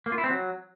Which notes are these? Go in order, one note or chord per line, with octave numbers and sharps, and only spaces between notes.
A#3
F4
E4
C4
F#3